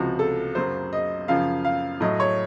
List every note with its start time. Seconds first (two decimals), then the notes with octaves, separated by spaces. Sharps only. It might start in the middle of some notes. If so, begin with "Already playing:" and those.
Already playing: C#2 C3 F3 F#4
0.19 A4
0.55 F#2 C#3 F#3 C5
0.93 D#5
1.28 F#2 C#3 F3 F5
1.65 F5
2.01 A2 F#3 D#5
2.20 C#5